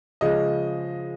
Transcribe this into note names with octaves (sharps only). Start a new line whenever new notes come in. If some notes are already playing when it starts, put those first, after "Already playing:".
C#3 F3 G#3 D#5